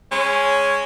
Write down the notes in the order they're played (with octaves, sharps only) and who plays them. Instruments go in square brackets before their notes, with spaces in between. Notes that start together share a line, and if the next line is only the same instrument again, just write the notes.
[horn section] G#3 C#4